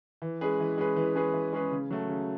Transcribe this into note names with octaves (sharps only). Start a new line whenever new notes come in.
E3
G#3 C#4 G#4 B4
E3
G#3 C#4 G#4 B4
E3
G#3 C#4 G#4 B4
E3
G#3 C#4 G#4 B4
C#3
F#3 A3
C#3